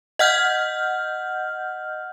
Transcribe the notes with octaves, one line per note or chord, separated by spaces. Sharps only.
D#5 F#5 F6 G6